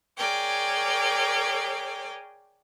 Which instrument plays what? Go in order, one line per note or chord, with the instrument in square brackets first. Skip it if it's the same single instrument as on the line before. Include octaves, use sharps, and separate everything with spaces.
[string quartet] G#4 A#4 C#5 D5 G5